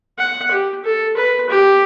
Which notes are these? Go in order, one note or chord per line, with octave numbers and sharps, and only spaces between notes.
F#5
G4
A4
B4
G4